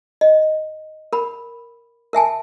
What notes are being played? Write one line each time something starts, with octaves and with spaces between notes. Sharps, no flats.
D#5
A#4 B5
A#4 E5 G#5 A5